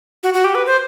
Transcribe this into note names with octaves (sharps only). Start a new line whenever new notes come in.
F#4
F#4
G4
B4
C5